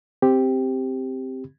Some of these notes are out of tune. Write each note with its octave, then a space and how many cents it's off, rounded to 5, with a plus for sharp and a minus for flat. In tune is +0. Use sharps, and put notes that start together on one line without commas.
C4 +0 G4 +0